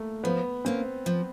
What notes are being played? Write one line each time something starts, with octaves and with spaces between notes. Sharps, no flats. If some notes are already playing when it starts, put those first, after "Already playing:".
Already playing: A3 A#3
F3 B3
A#3 C4 C#4
F3